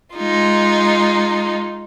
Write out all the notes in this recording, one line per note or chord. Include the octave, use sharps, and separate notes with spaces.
G#3 D#4 F4